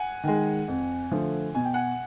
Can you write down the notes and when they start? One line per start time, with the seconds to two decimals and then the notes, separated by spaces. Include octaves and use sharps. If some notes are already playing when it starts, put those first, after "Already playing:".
Already playing: F#5 G#5
0.24 D#3 G#3
0.68 F2
1.12 D3 F3 A3
1.55 B2 G#5
1.65 G5
1.74 F#5 G#5